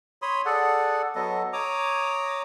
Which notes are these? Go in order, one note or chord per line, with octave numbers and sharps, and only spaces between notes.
C#5 B5 C6 D#6
G#4 A4 D5 F#5
F#3 B3 A4 D#5
C#5 A#5 D6 D#6